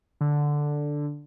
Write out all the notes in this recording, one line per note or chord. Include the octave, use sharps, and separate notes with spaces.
D3